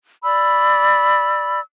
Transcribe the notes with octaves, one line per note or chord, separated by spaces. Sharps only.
D5 B5 E6